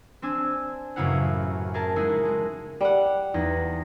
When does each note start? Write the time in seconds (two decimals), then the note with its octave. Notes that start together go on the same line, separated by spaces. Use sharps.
0.22 C4 D4 G#5 E6
0.96 A1 F#2 C#3 E4 F5 F#5
1.74 G#4 A#4 A5
1.96 G#3 D#4 E4 F#4 G#4
2.25 G#3
2.81 G3 F#5
3.34 E2 D#4 A#6